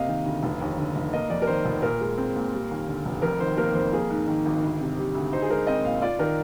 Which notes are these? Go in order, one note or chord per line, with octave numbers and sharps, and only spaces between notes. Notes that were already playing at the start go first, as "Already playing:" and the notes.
Already playing: C3 A#3 D#5 F5
D#3
D2
F1
D#2
D3
F1
A#3 D#5
F2 D5
A#4
D#3 C5
F1
A#2 A#4
G#3
C4
A#2
G3
D#2
D3
F1
F2 A#4
D#3 C5
A#3 A#4
F2 C5
A#3 G#4
G#2
D#3
G#1
D2
C3
G3
D2
D#4 C5
G#4
G#3 A#4
C4 D#5
A#2 F5
F4 D5
D#3 A#4